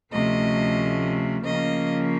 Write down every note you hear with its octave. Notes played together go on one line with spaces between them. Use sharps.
D2 C3 F3 A3 C#4 D#5
C#3 F3 A#3 C#4 D#5